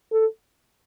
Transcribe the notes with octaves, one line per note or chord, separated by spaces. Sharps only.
A4